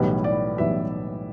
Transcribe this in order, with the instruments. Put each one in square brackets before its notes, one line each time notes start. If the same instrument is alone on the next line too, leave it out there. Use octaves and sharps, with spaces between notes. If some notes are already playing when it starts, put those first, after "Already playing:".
Already playing: [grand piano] B1 A2 E3 G3 B3
D5
B1 A2 E3 G3 B3 E5